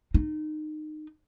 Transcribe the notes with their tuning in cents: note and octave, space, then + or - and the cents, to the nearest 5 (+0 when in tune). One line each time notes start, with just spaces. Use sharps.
D#4 -25